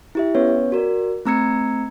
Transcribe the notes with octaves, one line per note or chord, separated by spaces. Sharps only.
E4 G4 E5
B3 C#4 B4 C#5
F#4 A#4 D5
A3 C4 A#5 E6 G#6 C#7